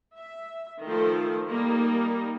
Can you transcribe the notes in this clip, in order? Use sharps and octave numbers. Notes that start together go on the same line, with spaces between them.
E5
D#3 F3 A3 A4 C5
G3 A#3 D#4 A#4